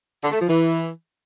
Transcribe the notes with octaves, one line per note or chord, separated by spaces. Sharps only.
D3
A3
F3
E3